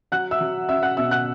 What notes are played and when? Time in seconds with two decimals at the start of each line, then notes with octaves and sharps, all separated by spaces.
0.12 F#3 F#5 F#6
0.31 E5 E6
0.41 F#3
0.69 C#4 E5 E6
0.83 F#5 F#6
0.97 B2 E5 E6
1.11 F#5 F#6